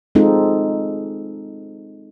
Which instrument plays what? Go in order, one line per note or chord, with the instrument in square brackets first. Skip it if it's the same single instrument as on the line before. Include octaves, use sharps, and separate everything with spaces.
[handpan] G#3 C4 D#4 F4 A4